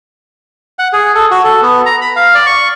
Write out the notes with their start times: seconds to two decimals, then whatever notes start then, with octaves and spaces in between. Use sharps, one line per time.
0.79 F#5
0.93 G#4
1.15 A4
1.31 F#4
1.44 A4
1.62 B3
1.86 A#5
2.01 B5
2.16 F5
2.35 D5
2.46 C#6